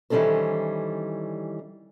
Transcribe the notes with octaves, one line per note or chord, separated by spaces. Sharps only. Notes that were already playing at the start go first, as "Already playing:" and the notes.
D#3 E3 G3 C#4 A4 C5